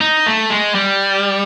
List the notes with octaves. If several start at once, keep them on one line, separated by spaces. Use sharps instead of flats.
D#4
A3
G#3
G3